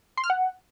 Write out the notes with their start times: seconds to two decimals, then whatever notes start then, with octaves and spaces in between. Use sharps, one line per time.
0.17 C6
0.24 F6
0.30 F#5